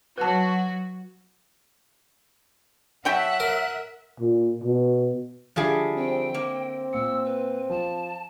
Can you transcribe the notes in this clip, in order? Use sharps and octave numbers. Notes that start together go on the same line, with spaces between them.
F#3 F#4 B4 A5
F#3 E5 F#5 G5 A5 F#6
A#4
A#2
B2
D3 F3 G3 G#4 E5
C4 G5
A#3
A#2 E6 C#7
B4
F3 A5